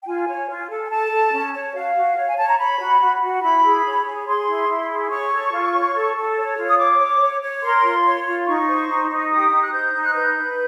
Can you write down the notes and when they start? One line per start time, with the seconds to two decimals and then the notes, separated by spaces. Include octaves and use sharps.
0.02 G5
0.07 F4 G#5
0.28 C#5
0.49 F4
0.70 A4
0.84 G#5
0.90 A4 A5
1.12 A4
1.32 C#4
1.54 C#5
1.74 F#4 F5
1.95 F#4
2.17 C#5
2.27 G#5
2.38 C#5 A5
2.49 A#5
2.59 C#5 B5
2.80 F#4
3.00 F#4
3.22 F#4
3.42 E4 B5
3.64 G#4
3.85 C#5
4.06 G#4
4.27 G#4 C6
4.47 E4
4.69 E4
4.90 G#4
5.11 C#5 C#6
5.32 A4
5.53 F4
5.74 C#5
5.94 A4
6.16 A4
6.37 C#5
6.58 F4
6.69 D#6
6.78 C#5 D6
6.99 C#5
7.21 C#5
7.41 C#5
7.63 A#4 C6
7.83 F4
8.04 C#5
8.26 F4
8.47 D#4 C#6
8.68 C5
8.89 D#4
9.09 D#4
9.30 G4 D#6
9.51 D#4
9.64 F#6
9.72 C5 G6
9.94 D#4
10.04 F#6
10.15 B4 G6
10.36 B4